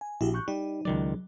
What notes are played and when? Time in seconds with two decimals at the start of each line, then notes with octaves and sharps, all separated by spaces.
0.01 G#5
0.21 A#1 E4 F#4 G4
0.34 C#6 F#6 G6
0.48 G3 D#4
0.85 C#2 D#3 F#3 D5